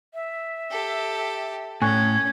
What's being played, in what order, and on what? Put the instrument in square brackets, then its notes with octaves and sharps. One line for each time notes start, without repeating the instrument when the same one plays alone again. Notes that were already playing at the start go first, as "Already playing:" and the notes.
[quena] E5
[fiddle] G4 A4
[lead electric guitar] A2 [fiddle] C#4 [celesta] G#5 C#6 F#6 [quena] G#6